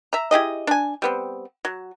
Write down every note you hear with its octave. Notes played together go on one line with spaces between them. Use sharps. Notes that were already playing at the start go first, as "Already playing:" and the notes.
E5 A#5
E4 G4 G#4 D#5
D4 G#5
G3 B3 C4
F#3